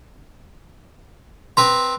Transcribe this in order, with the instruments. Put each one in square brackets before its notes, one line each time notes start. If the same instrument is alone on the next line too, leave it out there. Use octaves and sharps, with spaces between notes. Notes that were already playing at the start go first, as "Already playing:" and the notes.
[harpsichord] C4 B4 A#5 [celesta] C6